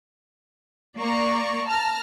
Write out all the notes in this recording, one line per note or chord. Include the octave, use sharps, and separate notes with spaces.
A#3 D5 A#5 C#6
A5 A#5 F6